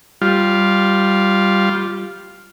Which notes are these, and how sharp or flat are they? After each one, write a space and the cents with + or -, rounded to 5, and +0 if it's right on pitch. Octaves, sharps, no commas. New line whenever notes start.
G3 -5 F4 +0